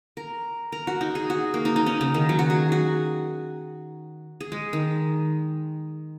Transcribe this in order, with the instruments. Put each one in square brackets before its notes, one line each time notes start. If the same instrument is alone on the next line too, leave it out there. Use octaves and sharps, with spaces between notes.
[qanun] A#4
A#4
F#4
D#4
G#4
F#4
A#3
D#4
D#4
C#4
C#3
D#3
F#3
F#4
G#4
F#4
G#4
G#3
D#3